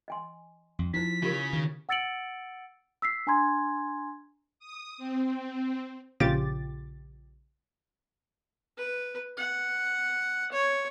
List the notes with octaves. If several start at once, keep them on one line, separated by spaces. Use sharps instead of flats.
D#5 G#5 C6
F2
F3 D#4 E4 C5 B6
C#3 F4 G4 A#4
D#3
F#5 E6 A6 C#7 D7 F#7
E6 B6 C7
D4 G#5 A#5 C6 G#6
D#6
C4
A#1 C#3 F4 G4 D6 A6
B4
F#5
C#5